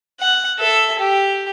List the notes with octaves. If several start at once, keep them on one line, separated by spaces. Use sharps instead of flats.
F#5
A4 E5
G4